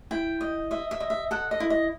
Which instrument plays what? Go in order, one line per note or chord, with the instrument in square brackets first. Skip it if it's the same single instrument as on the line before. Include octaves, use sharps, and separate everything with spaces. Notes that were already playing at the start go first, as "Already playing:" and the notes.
[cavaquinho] E4 G5
D#5
D#5 E5
E5
D#5
E5
A4 F#5
D#5
E4
D#5